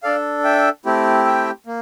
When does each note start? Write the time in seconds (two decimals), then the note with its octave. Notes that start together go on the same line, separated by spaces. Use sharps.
0.03 D4 A4 D5 F5
0.44 E5 G5
0.85 A3 C4 E4 G4
1.26 E5 G5
1.66 A#3